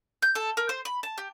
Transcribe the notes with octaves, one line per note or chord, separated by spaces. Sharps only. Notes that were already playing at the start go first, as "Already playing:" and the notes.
G6
A4
A#4
C5
B5
A5
G4